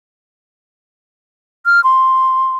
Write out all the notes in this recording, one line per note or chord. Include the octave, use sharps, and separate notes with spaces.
F6
C6